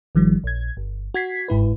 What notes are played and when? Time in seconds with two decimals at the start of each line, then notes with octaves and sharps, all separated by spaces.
0.15 G1 D#3 F3 G3
0.44 A#1 G#6
0.77 G1
1.14 F#4 G#6 B6 C7
1.48 G1 G#2 E4 B4